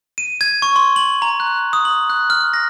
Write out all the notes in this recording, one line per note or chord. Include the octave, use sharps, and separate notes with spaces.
D#7
G#6
C#6
C6
F#7
A#5
F#6
D#6
F#7
F#6
F6
A#6